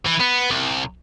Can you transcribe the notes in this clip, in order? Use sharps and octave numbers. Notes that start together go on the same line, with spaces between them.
E3
B3
C2